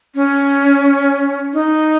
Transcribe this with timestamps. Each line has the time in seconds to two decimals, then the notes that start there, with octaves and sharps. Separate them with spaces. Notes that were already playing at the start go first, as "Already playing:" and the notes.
0.15 C#4
1.53 D#4